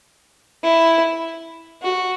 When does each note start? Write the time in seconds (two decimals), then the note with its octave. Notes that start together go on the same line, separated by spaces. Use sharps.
0.63 E4
1.83 F#4